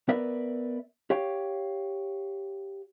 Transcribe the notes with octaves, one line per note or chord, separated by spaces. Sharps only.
B3 A#4 B4 D5 E5
G4 C#5 F5 G5